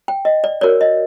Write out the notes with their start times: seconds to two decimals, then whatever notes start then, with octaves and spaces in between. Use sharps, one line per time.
0.08 G5
0.25 D#5
0.44 D5
0.61 F#4 A#4 C#5 D5
0.81 D#5